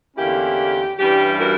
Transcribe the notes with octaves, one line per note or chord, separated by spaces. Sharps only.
E2 D3 A#3 C#4 E4 G4
G2 E3 G3 C#4 E4 G4
F#4 A#4